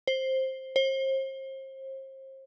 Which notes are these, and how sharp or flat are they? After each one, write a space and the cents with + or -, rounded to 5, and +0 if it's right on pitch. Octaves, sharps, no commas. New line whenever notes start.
C5 +10
C5 +35